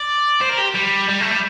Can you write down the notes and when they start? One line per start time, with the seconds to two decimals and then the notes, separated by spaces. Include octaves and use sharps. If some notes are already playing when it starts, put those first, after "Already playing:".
Already playing: D5
0.42 C5
0.50 A#4
0.59 G4
0.75 G3
1.09 G3
1.20 A3
1.31 G3